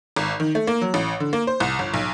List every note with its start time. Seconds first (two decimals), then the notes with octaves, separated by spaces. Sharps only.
0.16 G#1
0.40 D#3
0.55 A3
0.67 A#3
0.81 F#3
0.94 A1
1.20 D3
1.33 A#3
1.47 C5
1.60 C2
1.79 G1
1.94 B1